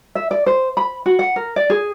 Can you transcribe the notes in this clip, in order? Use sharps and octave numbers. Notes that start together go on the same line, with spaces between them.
E5
D5
C5
B5
F#4
F#5
A#4
D5
G#4